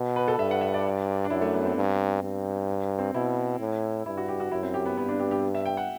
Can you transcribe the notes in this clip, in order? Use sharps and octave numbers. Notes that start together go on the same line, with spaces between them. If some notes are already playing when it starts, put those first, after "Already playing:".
Already playing: B2
B4
A4
G2 E5
F#5
E5
D5
D4
F#2 E4
A3
B3
C4
G2
G2
C4
B2 E4
A2
G2 E4
F#4
G4
F#4
F#2 E4
C4
G4
B3
G2 B3
D4
G4
G4
E5
G5
F#5